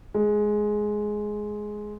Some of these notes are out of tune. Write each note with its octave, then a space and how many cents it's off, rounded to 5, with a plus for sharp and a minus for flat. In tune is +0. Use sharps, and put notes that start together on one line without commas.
G#3 +10